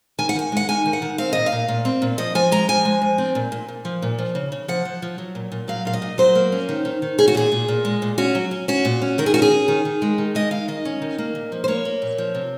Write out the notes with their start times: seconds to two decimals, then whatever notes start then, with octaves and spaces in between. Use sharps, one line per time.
0.18 D#3 G#5
0.29 F#5
0.36 D#3 G#5
0.52 G#3 F#5
0.69 D#3 G#5
0.86 D#3
0.93 F#5
1.02 D#3
1.18 C4 F5
1.33 A#2 D#5
1.46 F5
1.52 A#2
1.68 A#2
1.85 C4
2.02 A#2
2.18 F3 D#5
2.35 F3 G#5
2.52 G#3 A#5
2.68 F3 G#5
2.85 G#3
3.02 F3
3.18 C4
3.35 A#2
3.52 A#2
3.68 A#2
3.85 F3
4.02 A#2
4.18 F3
4.35 C#3
4.52 C#3
4.68 F3 F#5
4.85 F3
5.02 F3
5.18 F#3
5.35 A#2
5.52 A#2
5.68 F#3 F5
5.85 A#2 F5
5.93 D#5
6.02 A#2
6.18 F#3 C5
6.35 A#3
6.52 C#4
6.69 D#3
6.85 D#3
7.02 D#3
7.18 C#4 G#4
7.28 F#4
7.35 A#2 G#4
7.52 A#2
7.68 A#2
7.85 G#3
8.02 A#2
8.18 C#4 F#4
8.35 F#3
8.51 C#4
8.68 C#4 F#4
8.85 A#2
9.02 C#4
9.18 D#3 A#4
9.26 G#4
9.34 C#4 F#4
9.42 G#4
9.52 C#4
9.68 D#3
9.85 D#3
10.02 G#3
10.18 D#3
10.35 G#3 D#5
10.51 D#3 F5
10.68 D#3 D#5
10.85 C#4
11.02 D#3
11.18 A#3
11.35 A#2
11.52 F3
11.64 C5
11.68 A#3 C#5
11.85 A#3
12.02 A#2
12.18 F3
12.35 C3